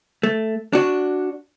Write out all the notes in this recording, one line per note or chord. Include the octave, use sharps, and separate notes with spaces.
A3
D4 F#4